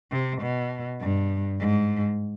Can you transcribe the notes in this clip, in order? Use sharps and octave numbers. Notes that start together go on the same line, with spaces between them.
C3
B2
G2
G#2